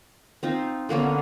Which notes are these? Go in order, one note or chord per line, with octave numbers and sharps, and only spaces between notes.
C4 D#4 F4
D3 A#3 B3 C#4